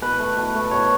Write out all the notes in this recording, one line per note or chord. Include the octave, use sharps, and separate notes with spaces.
B2 B4
A3
B2
A3
B2 C#5